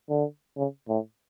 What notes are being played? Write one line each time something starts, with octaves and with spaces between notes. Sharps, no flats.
D3
C#3
A2